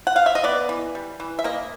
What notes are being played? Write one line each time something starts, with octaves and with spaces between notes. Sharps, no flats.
F#5
F5
E5
D#5
B3 D5
E3
G3
E3
E5
A#3 D#5